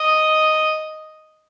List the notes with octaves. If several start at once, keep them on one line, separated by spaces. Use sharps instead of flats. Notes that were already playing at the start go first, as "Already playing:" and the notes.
Already playing: D#5